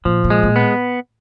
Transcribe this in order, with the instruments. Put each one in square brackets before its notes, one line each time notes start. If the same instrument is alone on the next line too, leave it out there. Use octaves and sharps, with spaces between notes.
[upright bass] A#2 [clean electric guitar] F3
[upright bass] A#2
[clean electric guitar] G#3
[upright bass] A#2
[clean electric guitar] B3